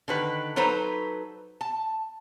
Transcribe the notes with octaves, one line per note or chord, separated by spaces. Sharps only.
D3 D#3 B4
F#3 D#4 A4 B4 C5 A#5
A5